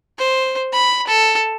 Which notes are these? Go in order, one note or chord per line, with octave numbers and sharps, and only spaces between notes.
C5
B5
A4